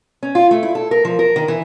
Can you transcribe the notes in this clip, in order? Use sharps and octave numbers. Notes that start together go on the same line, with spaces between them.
C#4
F4
A3
E4
A4
A#4
F3
A#4
D#3
E3